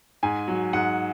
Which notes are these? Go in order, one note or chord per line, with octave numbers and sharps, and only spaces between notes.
G#2 G#5
F#3
G#2 F#5